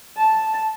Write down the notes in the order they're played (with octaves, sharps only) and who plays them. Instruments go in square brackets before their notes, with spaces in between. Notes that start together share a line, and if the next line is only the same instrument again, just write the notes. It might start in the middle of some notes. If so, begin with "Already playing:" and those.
[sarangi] A5